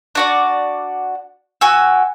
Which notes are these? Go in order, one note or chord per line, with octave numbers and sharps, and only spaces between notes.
D4 F#4 D5
F#4 G#5 E6